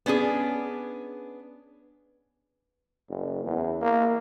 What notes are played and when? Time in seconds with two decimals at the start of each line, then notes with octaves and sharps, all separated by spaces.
0.06 B3 C#4 D4 G#4
3.09 F#1
3.45 E2
3.81 A#3